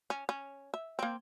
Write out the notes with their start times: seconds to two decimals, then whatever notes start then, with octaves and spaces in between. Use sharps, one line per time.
0.10 C#4
0.29 C#4
0.74 E5
0.99 A#3 C4